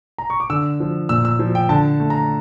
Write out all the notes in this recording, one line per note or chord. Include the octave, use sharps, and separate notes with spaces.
A#5
C#6
D6
D3 E6
F3
A#2 E6
E6
F3
G5
D3 A5
A3
A#5